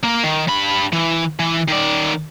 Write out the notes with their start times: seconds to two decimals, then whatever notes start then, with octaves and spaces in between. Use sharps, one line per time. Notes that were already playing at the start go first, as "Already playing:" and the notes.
0.04 A#3 A#4
0.24 D#3
0.48 G2 B5
0.93 E3
1.39 E3
1.68 D#3 D5